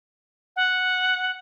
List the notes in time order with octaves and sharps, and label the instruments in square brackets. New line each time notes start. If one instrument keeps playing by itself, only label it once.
[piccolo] F#5